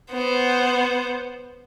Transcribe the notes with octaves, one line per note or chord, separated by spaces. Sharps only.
B3 C5